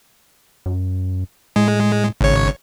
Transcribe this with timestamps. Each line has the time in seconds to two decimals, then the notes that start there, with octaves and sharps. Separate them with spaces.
0.66 F#2
1.56 A2 G#3
2.21 G#1 C#3 C#5